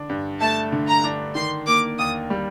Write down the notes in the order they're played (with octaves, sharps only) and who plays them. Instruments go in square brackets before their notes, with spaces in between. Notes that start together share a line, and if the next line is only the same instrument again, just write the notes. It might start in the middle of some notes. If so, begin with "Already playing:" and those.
Already playing: [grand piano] D3 D4
G2
[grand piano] A3 [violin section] A5
[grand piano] D3
[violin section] A#5
[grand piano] D4
[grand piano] D#3 [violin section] C6
[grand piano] A#3 [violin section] D6
[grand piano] D#2 [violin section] D#6
[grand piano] G3